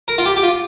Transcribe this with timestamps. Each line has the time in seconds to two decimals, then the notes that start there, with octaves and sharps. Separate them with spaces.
0.08 A#4
0.18 F4
0.26 G4
0.37 G4
0.43 F4